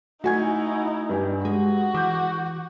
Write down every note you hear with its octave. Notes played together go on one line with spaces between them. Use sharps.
A3 D#4 E4 F#4 G#5 G#6
G2 G4 G#5
G#3 F#4 G#4
E3 D6 G6